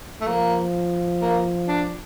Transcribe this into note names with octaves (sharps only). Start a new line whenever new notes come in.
A3
F3 A#3
A#3
D4